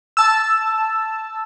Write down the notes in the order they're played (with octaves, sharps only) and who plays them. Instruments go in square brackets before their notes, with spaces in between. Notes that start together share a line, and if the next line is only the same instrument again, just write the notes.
[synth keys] A5 E6